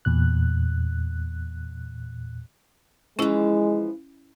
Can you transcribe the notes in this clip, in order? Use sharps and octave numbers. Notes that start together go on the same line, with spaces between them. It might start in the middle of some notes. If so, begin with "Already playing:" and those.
E2 A#2 F#6
E3 F3 G#3 C#4 E4